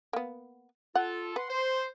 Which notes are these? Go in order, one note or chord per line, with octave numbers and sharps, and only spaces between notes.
A#3 B3
F4 A4 F#5
B4 F#5 C6
C5